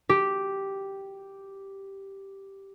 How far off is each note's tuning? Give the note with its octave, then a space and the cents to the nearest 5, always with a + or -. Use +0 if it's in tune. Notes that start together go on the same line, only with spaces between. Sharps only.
G4 -5